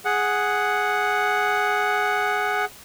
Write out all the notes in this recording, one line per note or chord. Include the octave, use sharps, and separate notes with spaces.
G#4 F#5